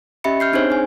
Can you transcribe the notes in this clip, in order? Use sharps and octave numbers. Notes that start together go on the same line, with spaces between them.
C#4 G4 D#5 E5 B5 C#7
F6 G6 C7
C4 D4 D#4 G#4 C5 C#5
G#4 G#5